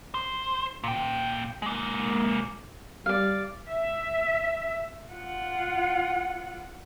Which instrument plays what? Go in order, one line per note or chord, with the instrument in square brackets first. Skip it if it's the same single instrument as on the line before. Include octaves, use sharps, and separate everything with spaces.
[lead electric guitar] C5
A#2 G5
G#3 A#3
[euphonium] G3 [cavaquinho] D5 F5
[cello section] E5
[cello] F4 F#5